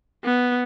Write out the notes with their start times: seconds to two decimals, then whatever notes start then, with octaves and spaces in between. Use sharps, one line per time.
0.24 B3